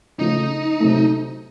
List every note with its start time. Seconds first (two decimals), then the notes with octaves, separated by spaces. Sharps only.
0.19 C#3 F3 A3 D#4
0.80 C3 F#3 A3